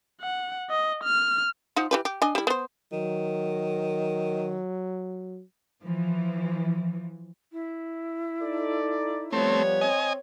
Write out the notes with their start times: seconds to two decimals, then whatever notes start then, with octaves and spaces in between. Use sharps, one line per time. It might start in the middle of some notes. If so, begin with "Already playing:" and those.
0.22 F#5
0.71 D#5
1.04 F6
1.76 F3 D#4 F#5
1.91 E3 G4 B4
2.05 G4
2.22 D4 D#5 G#5
2.35 G3 E4
2.47 B3 C5
2.92 D#3 F#3
5.84 E3 F3
7.52 E4
8.42 D#4 A4 D5
9.33 F3 G3 A3 B3 C4 C#5
9.81 C4 D#5 G#5